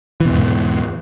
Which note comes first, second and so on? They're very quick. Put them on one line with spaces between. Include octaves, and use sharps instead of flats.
E3 B2 E2 G#2